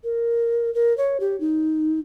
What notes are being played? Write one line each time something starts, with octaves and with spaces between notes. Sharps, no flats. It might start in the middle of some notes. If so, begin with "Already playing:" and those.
A#4
A#4
C#5
G4
D#4